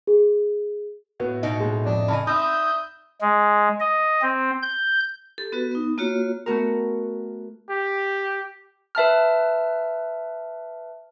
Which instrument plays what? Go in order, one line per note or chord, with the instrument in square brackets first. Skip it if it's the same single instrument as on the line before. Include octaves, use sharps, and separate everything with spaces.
[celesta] G#4
[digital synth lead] A2 [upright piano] B3 F#4
[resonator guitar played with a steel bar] B2 D#4 [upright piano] D#5
[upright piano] G#3
[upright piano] F2 D#5 [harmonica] D4
[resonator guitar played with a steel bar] C#3 E3 D#5 [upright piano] G#5 A5 B5
[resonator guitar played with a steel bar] C4 D#4 [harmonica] E5 D#6 [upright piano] B5 E6 [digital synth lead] G6
[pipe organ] G#3
D#5
C4
G6
[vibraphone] G4 A4
B3 F#4 B4
B3 D#4
A#3 F4 F#4 C#5
[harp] A3 B3 F#4 A#4
[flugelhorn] G4
[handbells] B4 E5 A5 F6